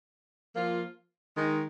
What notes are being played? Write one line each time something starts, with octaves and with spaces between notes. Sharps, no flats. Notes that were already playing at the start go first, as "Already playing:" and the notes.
F3 A#3 F4
D#3 G#3 D#4